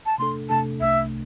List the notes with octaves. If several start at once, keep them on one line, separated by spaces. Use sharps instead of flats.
A5
C3 A3 D4 A4 C6
C3 A3 D4 A4 A5
C2 C3 A3 D4 E5